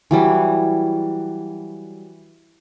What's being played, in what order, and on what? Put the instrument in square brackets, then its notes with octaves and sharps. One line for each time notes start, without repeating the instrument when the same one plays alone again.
[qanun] E3 F#3 G3